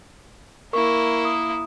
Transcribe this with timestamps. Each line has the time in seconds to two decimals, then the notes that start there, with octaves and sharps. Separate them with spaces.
0.73 A#3 E4 A#4 C#6
1.25 D#6